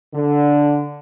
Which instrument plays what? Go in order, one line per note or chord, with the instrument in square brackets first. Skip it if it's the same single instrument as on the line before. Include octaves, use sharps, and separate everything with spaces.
[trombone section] D3